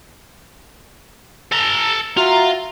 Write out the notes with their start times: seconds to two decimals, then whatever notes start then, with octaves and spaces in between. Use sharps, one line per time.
1.52 A4 A#5
2.17 F4 F#4 E5 A#5